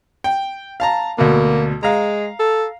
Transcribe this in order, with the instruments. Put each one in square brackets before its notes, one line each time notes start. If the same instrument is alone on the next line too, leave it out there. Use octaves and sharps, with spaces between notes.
[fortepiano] G5
F5 A5 A#5
[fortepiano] D2 B2 [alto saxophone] A#3
[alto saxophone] G#3 [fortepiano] F5 A#5
[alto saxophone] A4